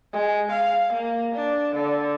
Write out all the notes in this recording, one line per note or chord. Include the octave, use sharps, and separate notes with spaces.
G#3
F5
A#3
D4
D3